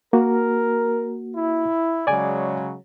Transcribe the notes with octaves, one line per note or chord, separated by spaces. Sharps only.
A#3 F#4 A#4
E4
C#3 F#3 G#3 D5 G#5 D6